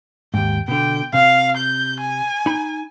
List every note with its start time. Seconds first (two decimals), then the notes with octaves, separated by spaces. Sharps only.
0.34 D#2 G#2 G5
0.68 B2 D3 G5
1.14 C3 F5
1.57 G6
2.01 G#5
2.46 D#4 B5